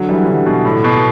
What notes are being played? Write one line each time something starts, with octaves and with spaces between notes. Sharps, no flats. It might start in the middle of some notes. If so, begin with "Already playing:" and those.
Already playing: D3 F#3
E3 G3
D3 F#3
B2
A2
B2